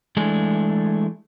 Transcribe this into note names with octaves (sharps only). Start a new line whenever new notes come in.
E3 G#3 A3 D4 G#4